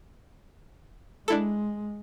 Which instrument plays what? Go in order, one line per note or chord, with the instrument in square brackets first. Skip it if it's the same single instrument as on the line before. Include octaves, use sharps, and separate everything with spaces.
[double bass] G#3 [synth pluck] D4 E4 A4